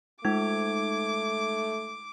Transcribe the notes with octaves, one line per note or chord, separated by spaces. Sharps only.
G#3 A3 D#4 D6 G#6